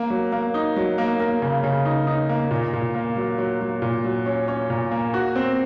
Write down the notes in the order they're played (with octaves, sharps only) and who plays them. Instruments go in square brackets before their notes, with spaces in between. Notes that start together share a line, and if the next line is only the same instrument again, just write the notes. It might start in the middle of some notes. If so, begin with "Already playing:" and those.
Already playing: [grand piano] A#3
F#3
A#3
D#4
F#3
A#3
A#3
C#3
C#3
D#4
D#4
A#3
A#2
A#2
A#3
F#3
F#3
F#3
A#2
F#3
C#4
C#4
A#2
A#3
F#4
C4